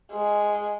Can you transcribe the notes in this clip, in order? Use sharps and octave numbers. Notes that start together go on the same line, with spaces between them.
G#3